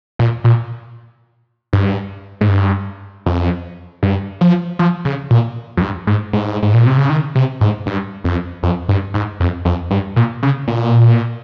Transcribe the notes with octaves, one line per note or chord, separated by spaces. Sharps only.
A#2
A#2
G2
G#2
G2
F2
G2
F3
F3
C#3
A#2
F2
G2
G#2
G#2
G#2
A#2
C3
C#3
D#3
C3
G#2
G2
F2
F2
G2
G#2
F2
F2
G2
A#2
C#3
A#2